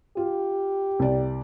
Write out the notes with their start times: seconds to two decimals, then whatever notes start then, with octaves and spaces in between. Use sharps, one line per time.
0.17 F4 G4
0.99 C2 D5